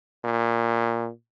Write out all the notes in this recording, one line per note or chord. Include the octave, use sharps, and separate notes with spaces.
A#2